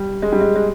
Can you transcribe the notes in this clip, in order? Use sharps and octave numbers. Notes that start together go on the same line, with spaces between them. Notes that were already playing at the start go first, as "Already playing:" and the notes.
Already playing: G3
G#3
G3
G#3
G#3